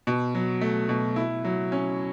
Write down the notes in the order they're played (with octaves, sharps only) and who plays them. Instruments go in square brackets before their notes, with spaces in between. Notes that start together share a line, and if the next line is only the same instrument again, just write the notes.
[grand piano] B2
F#3
A3
B2
E4
F#3
C#4